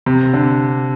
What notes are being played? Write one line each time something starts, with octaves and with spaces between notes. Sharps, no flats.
C3
D3